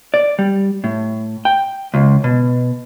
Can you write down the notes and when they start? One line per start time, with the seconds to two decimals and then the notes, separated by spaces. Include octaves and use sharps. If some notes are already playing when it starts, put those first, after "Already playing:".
0.14 D5
0.39 G3
0.84 A2
1.45 G5
1.94 C#2
2.24 B2